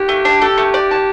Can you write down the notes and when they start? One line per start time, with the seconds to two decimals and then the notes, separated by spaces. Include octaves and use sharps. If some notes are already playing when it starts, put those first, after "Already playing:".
Already playing: G4
0.09 A3
0.25 D4
0.42 G4 A4
0.58 A3
0.74 D5
0.91 A5